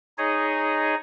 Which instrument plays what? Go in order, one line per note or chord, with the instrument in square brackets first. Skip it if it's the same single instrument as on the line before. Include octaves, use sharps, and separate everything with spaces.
[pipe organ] D#4 G#4 C#5 D#5